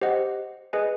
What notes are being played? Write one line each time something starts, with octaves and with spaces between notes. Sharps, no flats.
G4 C5 D#5 F#5
G#4 B4 D#5 G#5